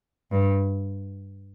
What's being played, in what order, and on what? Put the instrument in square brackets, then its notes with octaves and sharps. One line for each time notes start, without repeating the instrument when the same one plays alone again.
[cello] G2